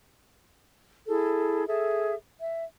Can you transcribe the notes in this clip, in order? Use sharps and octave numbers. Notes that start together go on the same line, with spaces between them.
E4 G#4 A4
G#4 A4 E5
E5